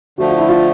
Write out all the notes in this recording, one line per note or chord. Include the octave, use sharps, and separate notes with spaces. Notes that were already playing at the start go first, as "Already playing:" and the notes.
D3 F3 A3 F#4
F4
E4
F4